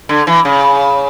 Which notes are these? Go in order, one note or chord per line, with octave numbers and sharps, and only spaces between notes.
D3
E3
C#3